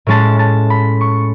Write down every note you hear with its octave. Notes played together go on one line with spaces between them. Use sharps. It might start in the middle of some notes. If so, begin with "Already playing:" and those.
A2 G#3 C#4 A5
A5
B5
C#6